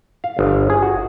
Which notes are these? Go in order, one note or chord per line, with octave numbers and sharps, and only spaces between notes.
F5
G1
G#4
F#4